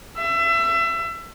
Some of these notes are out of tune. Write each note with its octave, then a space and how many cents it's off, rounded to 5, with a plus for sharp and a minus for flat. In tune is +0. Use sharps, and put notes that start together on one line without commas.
E5 +30